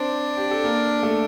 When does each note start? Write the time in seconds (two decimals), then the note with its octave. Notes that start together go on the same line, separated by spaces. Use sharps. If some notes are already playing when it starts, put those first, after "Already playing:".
Already playing: C4 D4 C5
0.37 G4
0.51 A4
0.64 A#3 A#4
1.03 A3 A4